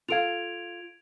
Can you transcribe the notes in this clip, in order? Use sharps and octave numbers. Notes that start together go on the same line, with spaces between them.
F4 A4 F5 G#6 D7 F7